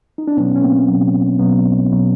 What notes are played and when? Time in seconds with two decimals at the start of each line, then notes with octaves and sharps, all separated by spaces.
0.18 D#4
0.28 D4
0.37 B2 F#3 B3 C#4
0.55 C#4
0.62 A#3 C4
0.88 B2 F#3
1.39 B2 F#3 B3
1.90 B2 F#3